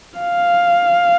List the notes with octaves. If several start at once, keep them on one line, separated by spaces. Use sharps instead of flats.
F5